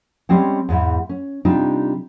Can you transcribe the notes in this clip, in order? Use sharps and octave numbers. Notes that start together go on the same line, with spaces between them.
G3 G#3 C4 C#4
E2 G#2 E3
C#4
C3 G3 D4 D#4 F4